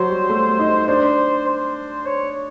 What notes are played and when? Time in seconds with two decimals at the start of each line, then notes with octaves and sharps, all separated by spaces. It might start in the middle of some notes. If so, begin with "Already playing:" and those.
Already playing: F#3 C5
0.10 G3
0.29 A3
0.59 D#4
0.87 D4 C5
1.47 C5
2.06 C#5